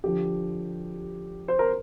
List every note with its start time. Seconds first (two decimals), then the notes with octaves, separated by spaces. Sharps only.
0.04 D3 F3 G4
1.48 C5
1.59 A#4